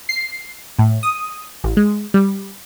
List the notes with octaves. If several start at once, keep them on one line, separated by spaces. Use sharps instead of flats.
C7
A2
D#6
A1
G#3
G3